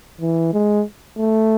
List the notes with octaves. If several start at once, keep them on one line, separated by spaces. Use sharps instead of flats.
E3
G#3
A3